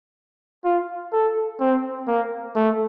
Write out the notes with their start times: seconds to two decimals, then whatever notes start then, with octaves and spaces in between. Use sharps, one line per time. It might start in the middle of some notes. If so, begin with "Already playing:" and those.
0.64 F4
1.13 A4
1.60 C4
2.07 A#3
2.55 A3